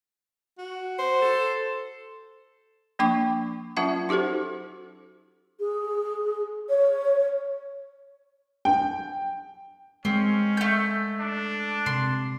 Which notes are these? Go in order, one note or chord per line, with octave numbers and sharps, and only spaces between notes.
F#4
C5
A4
F3 A#3 D4 G5 C#6 D6
F#3 C#4 F4 E5 F#5
D#4 F#4 G4 A4 C5
G#4
C#5
G5
G#3 C4 C#4
A3 G6
D4
C3 C6